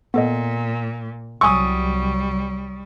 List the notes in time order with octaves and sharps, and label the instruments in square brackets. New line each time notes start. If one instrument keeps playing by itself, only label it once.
[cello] A#2 [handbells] B3 A4 D#5
[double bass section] C2 F#3 [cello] G3 [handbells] G#5 E6 [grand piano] C#6 D#6